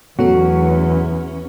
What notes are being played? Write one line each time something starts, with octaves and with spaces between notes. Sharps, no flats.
E2 F#3 A3 B3 C#4 F#4 A4